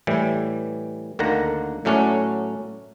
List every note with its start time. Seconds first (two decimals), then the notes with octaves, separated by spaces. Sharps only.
0.07 A2 E3 G3
1.19 D2 D3 D#3 A#3 F#5 A#5
1.85 A2 F#3 A3 C#4 D5 F#5